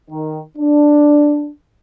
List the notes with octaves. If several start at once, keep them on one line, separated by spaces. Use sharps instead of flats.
D#3
D4